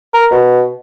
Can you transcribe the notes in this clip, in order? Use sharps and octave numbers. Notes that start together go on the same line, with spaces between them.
A#4
B2